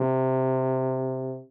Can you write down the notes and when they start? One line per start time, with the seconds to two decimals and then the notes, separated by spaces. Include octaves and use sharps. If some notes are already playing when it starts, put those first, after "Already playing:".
Already playing: C3